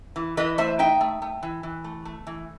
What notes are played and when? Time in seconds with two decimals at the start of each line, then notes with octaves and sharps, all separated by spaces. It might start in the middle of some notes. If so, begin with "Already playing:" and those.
0.16 E3
0.37 E3 B4 D#5
0.58 A3 C5 E5
0.79 D#4 E5 G5
1.01 A3
1.22 A3
1.43 E3
1.63 E3
1.84 A3
2.05 A3
2.27 E3